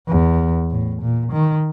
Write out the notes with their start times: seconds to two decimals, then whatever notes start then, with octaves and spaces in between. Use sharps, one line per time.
0.08 E2
0.71 A2
1.02 A#2
1.32 D#3